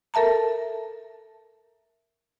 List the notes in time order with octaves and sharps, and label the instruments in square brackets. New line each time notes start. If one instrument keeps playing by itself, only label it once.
[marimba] A4 A#4 E5 A5 A#5